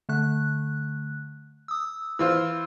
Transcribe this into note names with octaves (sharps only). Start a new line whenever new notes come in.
D3 A3 F#6
D#6 E6
E3 F4 C5 E6